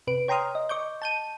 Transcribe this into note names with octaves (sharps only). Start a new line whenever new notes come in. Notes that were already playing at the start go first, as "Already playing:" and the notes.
C3 B4 D7
C#5 G5 A#5 C6 D#6 F6
D#5
D#5 C#6 D6 G6
A5 G6 D#7